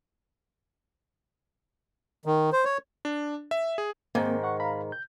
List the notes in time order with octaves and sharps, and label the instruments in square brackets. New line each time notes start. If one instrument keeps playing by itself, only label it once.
[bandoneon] D#3
C5
C#5
[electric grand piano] D4
E5
G#4
[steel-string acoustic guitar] G#2 D#3 [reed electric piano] A#3 C4
[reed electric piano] F#5 C#6
F5 A#5 B5
G6